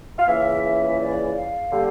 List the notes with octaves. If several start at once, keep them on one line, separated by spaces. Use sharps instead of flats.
F5
C#2 C#3 E3 A#3 E5
E5
D5
F5
D3 G3 A#3